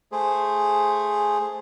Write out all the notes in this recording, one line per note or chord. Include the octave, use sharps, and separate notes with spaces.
A3 G#4 C5